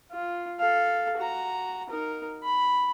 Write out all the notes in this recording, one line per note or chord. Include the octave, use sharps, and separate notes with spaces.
F4
A4 F5
F#4 A#5
D#4 A#4
B5